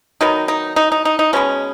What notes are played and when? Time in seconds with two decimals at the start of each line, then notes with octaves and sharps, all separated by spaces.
0.21 D#3 F#3 B3 D#4
0.48 D#4
0.76 D#4
0.92 D#4
1.05 D#4
1.19 D#4
1.33 B2 G#3 B3 C#4